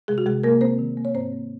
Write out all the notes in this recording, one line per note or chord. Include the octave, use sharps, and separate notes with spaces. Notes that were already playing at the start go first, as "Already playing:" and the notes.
C3 G#3 G#4
F#4
C3 G#3 G#4
C3 A#3 A#4
A#3 C4 C5
D#3
A#3
C#5
G#2 C4 C5
A#3